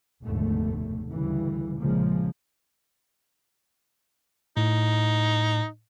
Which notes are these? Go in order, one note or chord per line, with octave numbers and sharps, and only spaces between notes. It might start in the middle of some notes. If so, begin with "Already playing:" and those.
F1 D#2 G#2 B2 D3 A3
D2 G2 C#3 E3 G3
A#1 C#3 F3 G#3 A#3
A2 D#4